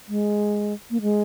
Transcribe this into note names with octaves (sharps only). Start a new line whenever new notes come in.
G#3
A#3
G#3